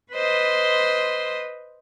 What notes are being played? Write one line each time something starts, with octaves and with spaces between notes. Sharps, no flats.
B4 C5 D#5 C6